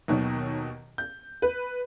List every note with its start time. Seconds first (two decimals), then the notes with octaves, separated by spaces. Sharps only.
0.08 D#2 B2 D#3 F#3
0.98 G6
1.42 B4